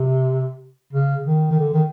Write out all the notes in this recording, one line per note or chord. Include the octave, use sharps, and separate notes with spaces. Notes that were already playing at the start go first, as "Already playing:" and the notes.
Already playing: C3
C#3
D#3
D#3
D3
D#3